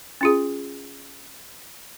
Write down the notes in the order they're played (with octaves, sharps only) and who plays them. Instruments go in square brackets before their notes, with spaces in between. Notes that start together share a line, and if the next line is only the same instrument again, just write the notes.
[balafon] C#4 F4 G#4